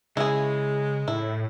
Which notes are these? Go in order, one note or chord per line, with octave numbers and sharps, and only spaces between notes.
C#3 G#3 E4 G#4
A2 E4